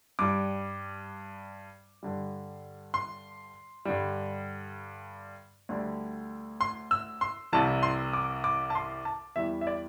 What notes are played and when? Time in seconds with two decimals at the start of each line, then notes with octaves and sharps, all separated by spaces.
0.19 G2 G3 D6
2.03 G2 D3 G3
2.94 C6
3.85 G2 D3 G3
5.69 D2 D3 G3
6.61 C6
6.91 E6
7.21 C6
7.52 C2 C3 E3 G3 A5
7.83 C6
8.13 D6
8.44 D6
8.70 A5
8.75 C6
9.05 A5
9.36 E2 E3 G3 E5
9.61 E5
9.67 D5